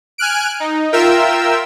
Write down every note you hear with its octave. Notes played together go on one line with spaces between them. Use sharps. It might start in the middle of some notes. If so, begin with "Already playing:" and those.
G#5 F6 F#6 D7
D#4
F4 A#4 E5 G5 E6